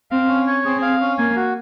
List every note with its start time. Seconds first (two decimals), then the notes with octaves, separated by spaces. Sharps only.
0.11 C4 F5
0.28 C#4
0.47 C#5
0.65 C4 G#4
0.82 F5
1.01 C#4
1.18 A#3 G#5
1.36 F#4